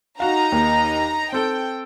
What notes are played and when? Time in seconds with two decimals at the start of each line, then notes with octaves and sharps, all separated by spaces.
0.20 D#4 F#4 F5 A#5
0.52 D#2 A#3
1.32 C4 A4 G5